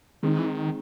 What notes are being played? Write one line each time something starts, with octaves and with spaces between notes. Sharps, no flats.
D#3 G#3 C4 D#4
E3
D#3